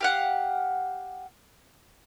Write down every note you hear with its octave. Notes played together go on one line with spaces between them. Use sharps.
G4 F5 F#5